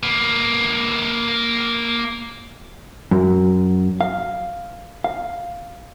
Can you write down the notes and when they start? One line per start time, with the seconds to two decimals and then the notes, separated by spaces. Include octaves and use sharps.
0.03 A#3 B4
3.11 F#2
4.01 F5
5.04 F5